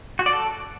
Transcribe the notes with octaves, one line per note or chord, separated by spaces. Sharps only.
F#4
D5
A4